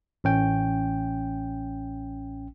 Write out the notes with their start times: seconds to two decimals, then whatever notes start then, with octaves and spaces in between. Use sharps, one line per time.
0.24 A1 C#4 G5